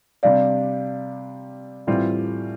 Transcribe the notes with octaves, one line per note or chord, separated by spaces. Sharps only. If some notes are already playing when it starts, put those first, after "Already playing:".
C3 G3 D4 D5 F5
A2 E3 G3 C4 F4